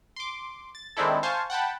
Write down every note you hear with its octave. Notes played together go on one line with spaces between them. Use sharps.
C6 D6
A6
D#3 G#3 C4 D4 E4 A4
C5 F5 G#5 A5 C6 C#6
F#5 G5 A5 B5